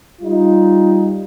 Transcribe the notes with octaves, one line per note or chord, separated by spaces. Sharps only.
G3 D#4 F4